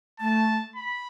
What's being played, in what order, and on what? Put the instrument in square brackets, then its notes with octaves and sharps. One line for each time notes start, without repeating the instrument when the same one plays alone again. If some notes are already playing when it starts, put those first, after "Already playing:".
[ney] A3 [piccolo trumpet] A5
[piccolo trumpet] B5